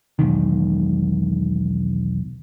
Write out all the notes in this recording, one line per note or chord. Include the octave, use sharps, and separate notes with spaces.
E1 B1 D#3